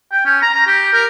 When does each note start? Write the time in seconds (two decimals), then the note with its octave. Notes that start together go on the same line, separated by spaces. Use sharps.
0.12 G5
0.26 C#4
0.42 A#5
0.55 A#5
0.67 G4
0.93 A#4